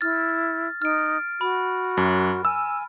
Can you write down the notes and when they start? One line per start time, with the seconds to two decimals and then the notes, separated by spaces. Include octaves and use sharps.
0.01 E4 F6 A6
0.82 D#4 F6 D7
1.41 F#4 B5
1.97 F#2
2.45 G#5 E6